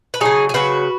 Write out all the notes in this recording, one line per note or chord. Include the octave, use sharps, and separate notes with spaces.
B4
C#3 F#3 D#4 G#4
G#4
C#3 F#3 F#4 B4